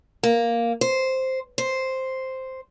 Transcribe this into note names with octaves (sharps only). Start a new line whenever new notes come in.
A#3
C5
C5